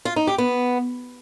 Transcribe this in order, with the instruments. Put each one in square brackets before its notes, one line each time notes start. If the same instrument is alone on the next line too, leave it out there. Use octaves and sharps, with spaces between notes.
[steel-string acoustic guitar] F4
D#4
G4
B3